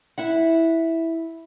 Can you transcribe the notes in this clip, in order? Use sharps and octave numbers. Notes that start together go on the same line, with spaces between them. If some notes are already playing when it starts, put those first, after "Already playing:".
E4 E5 F#5